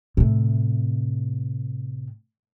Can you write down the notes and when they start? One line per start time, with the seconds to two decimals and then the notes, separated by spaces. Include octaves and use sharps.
0.17 A2 C3